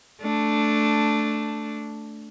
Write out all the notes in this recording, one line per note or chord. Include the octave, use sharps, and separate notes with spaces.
A3 D4